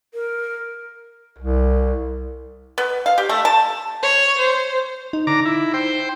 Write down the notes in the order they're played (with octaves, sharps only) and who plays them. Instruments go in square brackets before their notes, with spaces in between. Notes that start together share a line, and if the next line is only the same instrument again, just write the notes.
[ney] A#4
[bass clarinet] C2
[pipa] B3
F5
G4
A3
A5
[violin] C#5
C5
[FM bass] D#4
[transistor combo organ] D3 A#5 D6
E4
C5 G5